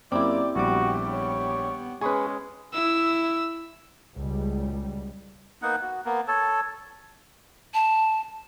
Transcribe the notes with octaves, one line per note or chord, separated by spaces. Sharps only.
F#2 A#3 C4 E4 G4 D5 D6
A#1 G3 B3 F#4 G4 D6
C#5
G#3 C#4 G#4 B4 B5 C#6 D#6
E4 E6
C#2 B2 G3
A#3 B3 D#4 F#5
F#4
A#3 B3
A4 C#5 A5
A5